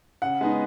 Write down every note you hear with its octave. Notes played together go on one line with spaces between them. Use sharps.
C#3 F#5
G#3 B3 D#4